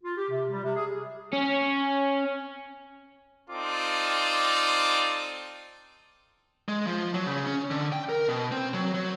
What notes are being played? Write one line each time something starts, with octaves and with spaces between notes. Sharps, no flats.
F4
G4
C3
G3
C3
G#4
C#4
C4 D#4 F4 A4 D5 D6
G#3
F3
F#3
C#3
C#4
D3
G5
A#4
B2
C4
F#3
F#3